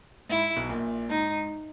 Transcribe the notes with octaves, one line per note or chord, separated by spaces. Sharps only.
G#2 E4
B1 B2
A#1 A#2
G#2 D#4